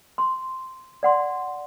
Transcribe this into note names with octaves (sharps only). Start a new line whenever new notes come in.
C6
D5 F#5 C6